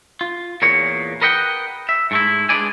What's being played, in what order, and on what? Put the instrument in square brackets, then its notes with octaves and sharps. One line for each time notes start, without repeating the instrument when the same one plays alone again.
[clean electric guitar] F4
E2 A#2 A#3 B3 C#5
A#4 B4 D#5 F#5 G5
E5
G#2 A3 E4
G#3 D4 B4 D5 G#5